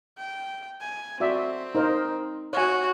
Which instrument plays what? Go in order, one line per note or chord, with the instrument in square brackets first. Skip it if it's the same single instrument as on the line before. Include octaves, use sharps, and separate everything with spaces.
[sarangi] G5
G#5
[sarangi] C4 [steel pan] F#4 D5 E5
[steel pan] D#4 A#4 C5
[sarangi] F#4 [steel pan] C#5 G#5